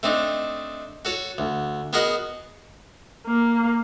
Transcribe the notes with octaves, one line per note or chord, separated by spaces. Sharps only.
A3 C4 D4 D#4
F#4 A4 C#5
D2
B3 F#4 G#4 A#4 D#5 F#5
A#3